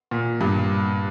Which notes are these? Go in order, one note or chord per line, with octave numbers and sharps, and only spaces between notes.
A#2
G2